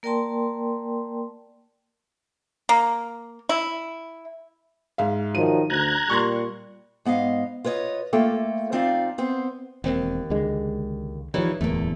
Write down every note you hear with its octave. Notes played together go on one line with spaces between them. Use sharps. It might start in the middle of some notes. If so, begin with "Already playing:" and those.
A#3 A#4 D5 G5 A5 C6
A#3
E4
G#2 E5 F5
D#3 F3 F#3 D#7
D2 A#5 F#6 G#6
A#2 G3 C6 C#6
G#2 B3 D#5 F5
F4 B4 C#5 D#5
A3 A#3 F4 A4 G5
F2 C4 D#4 F4 D5 F5
B3 C4 C5
E1 D#2 C4
C#2 D3 G#3
E3 F3 G3 D#4 C#5
D1 E2 A3 A#3